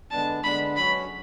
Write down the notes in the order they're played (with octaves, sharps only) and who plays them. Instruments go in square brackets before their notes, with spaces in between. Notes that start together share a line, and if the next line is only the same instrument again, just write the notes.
[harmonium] D3 G#3 B3 D4 [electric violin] A5
[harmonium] D3 G#3 B3 D4 [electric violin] B5
[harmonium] F#3 C#4 F#4 C#5 [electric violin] B5